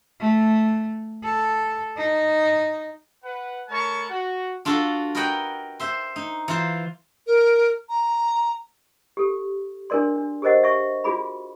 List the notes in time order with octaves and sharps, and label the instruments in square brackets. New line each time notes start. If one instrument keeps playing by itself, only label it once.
[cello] A3
A4
D#4
[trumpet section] B4 F#5
A3 A#4 C#5 A5 B5 C#6
F#4
[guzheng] D4 F4 F#4 A4
A#4 B4 C#5 D#5 F#5 G5
C5 E5 C6
D#4
E3 F4 C5
[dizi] A#4
A#5
[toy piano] G4 A4
D4 G#4 A#4 D5 C6
D4
G4 G#4 A#4 C5 D#5 F#5
E5 C#6
F4 F#4 G#4 B5